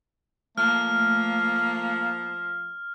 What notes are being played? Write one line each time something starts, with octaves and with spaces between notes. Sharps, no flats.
F3 A3 A#3 F6